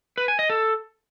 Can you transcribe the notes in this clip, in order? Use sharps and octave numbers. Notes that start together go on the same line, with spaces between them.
B4
G#5
D#5
A4